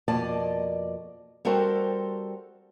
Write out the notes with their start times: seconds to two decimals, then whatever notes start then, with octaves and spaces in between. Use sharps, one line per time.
0.08 F2 B2 A#3 D5 D#5 A5
1.45 G3 C4 F#4 A4 A#4 C5